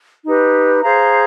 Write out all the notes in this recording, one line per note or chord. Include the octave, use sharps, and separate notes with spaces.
D#4 G4 B4
G#4 C5 F5 A#5